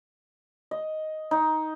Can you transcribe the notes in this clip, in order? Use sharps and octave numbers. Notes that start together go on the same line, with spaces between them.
D#5
D#4